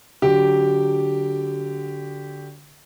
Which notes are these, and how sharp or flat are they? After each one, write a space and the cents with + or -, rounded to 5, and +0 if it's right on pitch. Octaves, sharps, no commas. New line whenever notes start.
D3 -15 F#3 +0 G4 +0